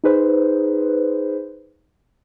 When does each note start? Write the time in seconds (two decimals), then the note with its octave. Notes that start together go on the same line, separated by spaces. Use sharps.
0.04 D#4 G#4 B4 C5